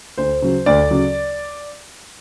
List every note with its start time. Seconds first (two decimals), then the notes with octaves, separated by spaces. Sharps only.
0.18 D2 C5
0.42 C#3 F#3
0.66 D2 D5
0.90 C#3 F#3